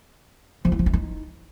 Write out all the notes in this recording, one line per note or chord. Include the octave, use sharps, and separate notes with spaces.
F3
E4
F3
E4
D#4